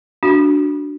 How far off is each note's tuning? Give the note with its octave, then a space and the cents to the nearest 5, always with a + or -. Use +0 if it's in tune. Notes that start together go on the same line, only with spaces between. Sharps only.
D4 +0 F#4 +0